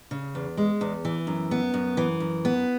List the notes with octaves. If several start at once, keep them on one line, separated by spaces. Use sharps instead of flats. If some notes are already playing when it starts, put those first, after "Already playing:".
C#3
E2
G#3
E2
E3
F#2
B3
F#2
E3
F#2
B3